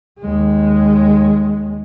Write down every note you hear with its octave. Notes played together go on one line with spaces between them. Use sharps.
D#2 G#3